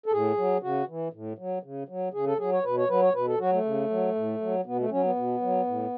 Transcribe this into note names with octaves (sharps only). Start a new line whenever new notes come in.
A4
A2 G#4
F#3
C#3 F#4
E3
A2
F#3
C#3
F#3
C#3 G#4
A4
F#3 G#4
C#5
B2 B4
C#5
F#3 B4
C#5
B2 B4
A4
F#3 F#4
A3
C#3
F#3
A2
F#3
B2 B3
A3
F#3 C#4
B3
B2
F#3
A2